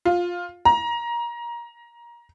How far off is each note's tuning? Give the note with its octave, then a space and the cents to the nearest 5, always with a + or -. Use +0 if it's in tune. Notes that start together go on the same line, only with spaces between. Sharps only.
F4 +10
A#5 +20